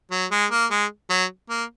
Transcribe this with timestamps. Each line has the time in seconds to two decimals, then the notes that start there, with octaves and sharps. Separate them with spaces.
0.11 F#3
0.31 G#3
0.51 A#3
0.70 G#3
1.10 F#3
1.50 A#3